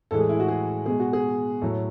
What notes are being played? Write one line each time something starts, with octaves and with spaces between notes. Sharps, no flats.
A2 E3 G#3 A4
G#4
E4
F#4
G#4
B2 G#3 G#4
F#4
G#4
A2 F#3 A4